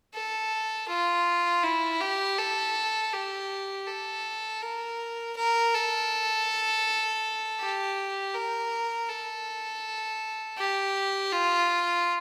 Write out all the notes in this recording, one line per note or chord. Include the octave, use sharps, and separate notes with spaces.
A4
F4
E4
G4
A4
G4
A4
A#4
A#4
A4
G4
A#4
A4
G4
F4